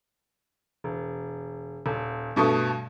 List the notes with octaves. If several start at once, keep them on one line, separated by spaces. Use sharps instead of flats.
E1
D#1
G2 B2 A3 C#6 D#6